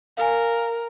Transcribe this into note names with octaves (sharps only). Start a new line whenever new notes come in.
A#4 F5 G#5